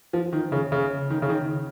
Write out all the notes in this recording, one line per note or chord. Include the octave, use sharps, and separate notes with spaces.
F3
D#3
C#3
C#3
D#3
C#3
D#3